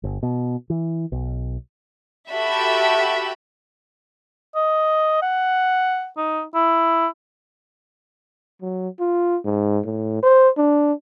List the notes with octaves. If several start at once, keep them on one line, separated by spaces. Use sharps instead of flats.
G1
B2
E3
B1
F#4 G4 A4 E5 B5
D#5
F#5
D#4
E4
F#3
F4
G#2
A2
C5
D4